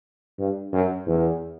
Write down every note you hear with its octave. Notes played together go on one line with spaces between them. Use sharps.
G2
F#2
E2